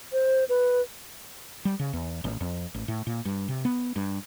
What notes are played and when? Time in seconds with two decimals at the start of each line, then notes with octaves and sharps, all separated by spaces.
0.13 C5
0.49 B4
1.65 G3
1.79 C#3
1.93 E2
2.24 A1
2.41 F2
2.74 A1
2.88 A2
3.07 A#2
3.25 G2
3.48 C3
3.65 B3
3.96 G2